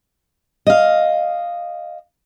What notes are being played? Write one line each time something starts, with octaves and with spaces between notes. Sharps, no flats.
D#5 F5